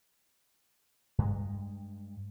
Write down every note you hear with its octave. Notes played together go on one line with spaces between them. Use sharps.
G2 G#3